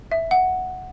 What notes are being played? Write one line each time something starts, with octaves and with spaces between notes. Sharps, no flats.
E5
F#5